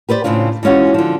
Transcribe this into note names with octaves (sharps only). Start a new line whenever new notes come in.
G4 B4 C5 D5
A2 C#3 C4 D4 F4
E3 G#3 C#4 F4 F#4
D3 F3